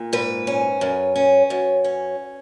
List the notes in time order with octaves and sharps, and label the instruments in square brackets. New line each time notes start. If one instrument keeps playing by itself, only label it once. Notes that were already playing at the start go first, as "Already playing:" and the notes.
Already playing: [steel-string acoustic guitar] A#2
G#2 B4
C#4
F#2
C#4
F#2
C#4